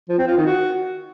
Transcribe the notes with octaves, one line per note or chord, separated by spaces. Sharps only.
F3
C4
F4
D#3
F#4